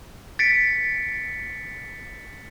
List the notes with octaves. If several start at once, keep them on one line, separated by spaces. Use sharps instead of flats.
A6 B6 C#7 D7